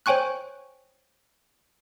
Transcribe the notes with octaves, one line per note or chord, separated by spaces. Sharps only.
C5 C#5 G5 G#5 C#6 F#6